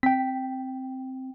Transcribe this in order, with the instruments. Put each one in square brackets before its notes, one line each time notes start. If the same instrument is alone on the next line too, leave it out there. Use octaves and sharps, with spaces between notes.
[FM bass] C4 [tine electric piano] G5 B6